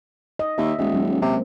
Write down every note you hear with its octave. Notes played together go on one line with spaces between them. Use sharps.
D#5
D#2 E5
D#1 G#3 D#5
F#3 G#3 C#4
C3 A#3 C4